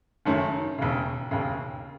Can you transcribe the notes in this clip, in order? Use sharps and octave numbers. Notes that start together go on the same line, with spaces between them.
F#1 F#2 D#3 A3 C#4
E1 D#2 C#3
E1 D#2 C#3